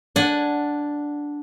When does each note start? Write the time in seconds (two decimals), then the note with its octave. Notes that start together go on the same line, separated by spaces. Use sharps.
0.16 D4 F#5 G#5